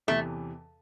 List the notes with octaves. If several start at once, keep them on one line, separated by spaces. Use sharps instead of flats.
E2 C3 E3 A3